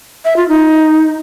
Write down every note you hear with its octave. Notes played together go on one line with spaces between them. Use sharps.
E5
F4
D#4